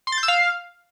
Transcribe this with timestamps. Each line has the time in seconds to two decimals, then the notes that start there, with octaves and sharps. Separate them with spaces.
0.07 C6
0.12 A6
0.18 G6
0.23 E6
0.28 F5